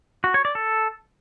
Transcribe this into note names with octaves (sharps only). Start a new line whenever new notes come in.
F#4
C#5
D5
A4